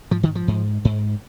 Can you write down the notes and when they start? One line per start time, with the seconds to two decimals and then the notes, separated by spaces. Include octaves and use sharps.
0.11 G#2 F3
0.23 D#3
0.35 F3
0.48 G#2
0.85 G#2